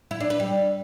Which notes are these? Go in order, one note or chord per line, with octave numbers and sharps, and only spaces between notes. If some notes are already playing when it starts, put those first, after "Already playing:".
E4
D4
B4
G3